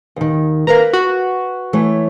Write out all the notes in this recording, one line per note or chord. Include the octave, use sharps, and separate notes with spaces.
D#2 D#3
A#3 A#4 B4 A#5
F#4
E3 A3 C#5